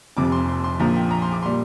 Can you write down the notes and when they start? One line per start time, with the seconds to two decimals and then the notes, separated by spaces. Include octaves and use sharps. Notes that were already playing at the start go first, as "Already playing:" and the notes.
0.17 F1 F2 C3 D6
0.32 C6
0.48 C6
0.64 C6
0.80 A#1 A#2 F3 A#5
0.96 G5
1.11 A#5
1.22 C6
1.32 D6
1.43 A#2 G3 C6